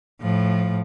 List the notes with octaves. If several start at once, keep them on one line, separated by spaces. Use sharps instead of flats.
A2 F3